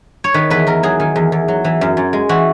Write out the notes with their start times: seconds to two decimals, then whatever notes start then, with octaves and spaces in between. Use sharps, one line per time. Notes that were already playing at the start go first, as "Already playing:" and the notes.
0.24 C#5
0.34 D#3 B4
0.50 E2 B4
0.67 E2 A#4
0.83 F#3 G#4
1.00 D#3
1.16 E2
1.32 E2
1.48 F#3
1.64 E3
1.81 F#2
1.97 F#2
2.13 G#3
2.29 E3 F#4